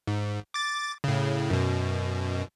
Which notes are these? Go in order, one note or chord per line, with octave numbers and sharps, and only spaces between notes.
G#2
D6 A6
A2 C#3
F#2 B2